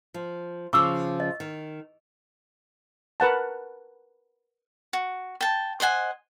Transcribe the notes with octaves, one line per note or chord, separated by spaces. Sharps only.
F3
C#3 F3 C#6 D6 E6
D#5
D#3
A#4 B4 F#5 A5
F#4
G5 A5
C5 D#5 F#5 G#5